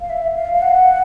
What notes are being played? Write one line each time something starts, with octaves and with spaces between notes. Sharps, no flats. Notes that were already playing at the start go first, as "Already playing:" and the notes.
F5
E5
F5
F5
F#5